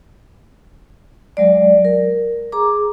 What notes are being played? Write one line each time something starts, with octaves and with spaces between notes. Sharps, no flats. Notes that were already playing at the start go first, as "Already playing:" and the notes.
F#3 G#3 D5
A#4
G#4 A#5 D6